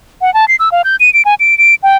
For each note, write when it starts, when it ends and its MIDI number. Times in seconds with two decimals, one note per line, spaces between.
0.21 0.33 78
0.34 0.48 81
0.48 0.56 96
0.59 0.69 88
0.72 0.82 77
0.84 0.96 91
1.00 1.12 99
1.13 1.22 98
1.25 1.35 80
1.40 1.57 98
1.58 1.75 98
1.83 1.97 79